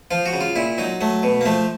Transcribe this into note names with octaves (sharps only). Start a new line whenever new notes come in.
F3 F4
F#4
C#3
F4
A#2 E4
F#3 D#4
F#3 A3
B2
A#3
F3 A3